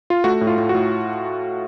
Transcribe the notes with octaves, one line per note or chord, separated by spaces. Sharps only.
F4
A3 F#4
A2
F4
A2
F#4
A2